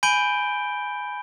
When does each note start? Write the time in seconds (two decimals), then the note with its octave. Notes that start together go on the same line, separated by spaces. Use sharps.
0.03 G#5 B5 G6 D7 G7